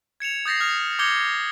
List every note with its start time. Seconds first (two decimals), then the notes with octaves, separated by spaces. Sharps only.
0.20 G#6 C#7 E7 F7
0.46 D#6 G6 A6 A#6 C7
0.60 D#6 F6 F7
0.99 D6 G6 G#6 C#7 G7